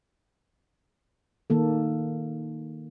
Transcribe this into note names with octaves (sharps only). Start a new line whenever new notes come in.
D#3 A#3 A4